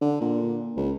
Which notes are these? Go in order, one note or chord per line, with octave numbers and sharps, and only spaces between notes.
D3
A#2
C#2